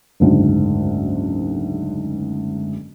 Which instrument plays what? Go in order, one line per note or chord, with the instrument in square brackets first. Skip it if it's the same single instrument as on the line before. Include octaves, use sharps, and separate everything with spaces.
[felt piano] F#1 D2 G#2